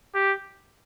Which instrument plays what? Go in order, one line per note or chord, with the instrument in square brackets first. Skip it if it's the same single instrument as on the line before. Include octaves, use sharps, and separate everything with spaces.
[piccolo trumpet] G4